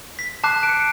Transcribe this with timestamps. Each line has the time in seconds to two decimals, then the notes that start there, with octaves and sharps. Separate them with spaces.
0.19 B6
0.44 A5 D6 F#6 C7
0.63 D7
0.69 C#7